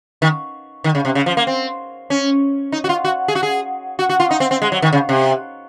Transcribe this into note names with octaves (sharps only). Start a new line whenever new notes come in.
D#3
D#3
C#3
C3
C#3
F3
A#3
C4
C#4
D#4
F#4
F4
F#4
G#4
F#4
G#4
F#4
F#4
F4
D#4
C4
C4
G#3
F#3
D#3
C#3
C3